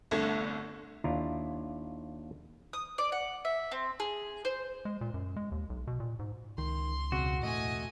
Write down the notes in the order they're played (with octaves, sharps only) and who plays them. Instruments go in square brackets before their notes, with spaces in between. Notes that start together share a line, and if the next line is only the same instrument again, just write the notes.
[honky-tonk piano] G1 C2 D3 A3 A4 G#6
[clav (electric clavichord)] D#2 D4 E4 F4 A#5
[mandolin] D#6
D5
F#5
E5
C4
G#4
C5
[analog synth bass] G#3
A#2
F#2
G#3
D#2
B1
B2
A#2
G#2
[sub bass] C#2 [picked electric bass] D#3 [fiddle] C6
[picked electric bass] E1 C#3 C4 [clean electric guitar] F#4
[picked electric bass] E1 A3 [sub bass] A2 [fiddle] D#5 G#5